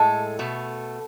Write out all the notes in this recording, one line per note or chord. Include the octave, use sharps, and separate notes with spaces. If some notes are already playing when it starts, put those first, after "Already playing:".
Already playing: A2 G#3 A4
B2 A3